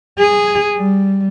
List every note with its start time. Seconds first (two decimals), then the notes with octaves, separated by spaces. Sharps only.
0.19 G#4
0.77 G3